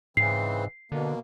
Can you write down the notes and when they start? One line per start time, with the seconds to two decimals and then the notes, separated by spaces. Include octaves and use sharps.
0.17 G#2 C#3 E3 C4 C7
0.92 B2 D3 A#3